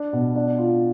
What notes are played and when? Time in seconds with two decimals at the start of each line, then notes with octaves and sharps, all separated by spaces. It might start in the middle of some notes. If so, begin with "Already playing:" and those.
Already playing: D4
0.13 B2
0.35 D4
0.58 F4